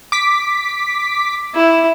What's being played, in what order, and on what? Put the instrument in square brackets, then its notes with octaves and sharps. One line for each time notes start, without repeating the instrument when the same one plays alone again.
[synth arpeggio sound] D6 B6
[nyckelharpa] E4